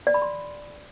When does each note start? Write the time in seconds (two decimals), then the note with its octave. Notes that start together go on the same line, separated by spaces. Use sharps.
0.07 D5
0.14 B5
0.22 C6